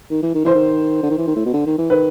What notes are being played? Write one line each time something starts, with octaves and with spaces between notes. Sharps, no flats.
D#3
E3
D#3
E3 C5
D#3
D3
D#3
E3
D#3
A2
B2
D3
D#3
E3
D#3 B4